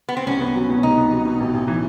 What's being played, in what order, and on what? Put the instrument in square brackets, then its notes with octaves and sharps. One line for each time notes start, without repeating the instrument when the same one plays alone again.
[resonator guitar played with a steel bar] B3
C4
[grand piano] C2 [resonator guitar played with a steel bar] C#4
[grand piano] B3
F#3
B2
[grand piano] C2 [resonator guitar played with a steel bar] D#4
[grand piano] B3
F#3
B2
A1
A1
E3